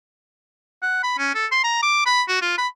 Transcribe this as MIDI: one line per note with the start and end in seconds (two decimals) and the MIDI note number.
0.82 1.02 78
1.03 1.14 83
1.18 1.30 61
1.35 1.46 69
1.51 1.61 84
1.64 1.79 82
1.83 2.02 86
2.06 2.23 83
2.28 2.39 66
2.42 2.56 65
2.58 2.67 83